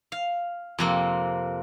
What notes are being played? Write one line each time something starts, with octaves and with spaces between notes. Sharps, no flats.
F5
F2 C3 A#3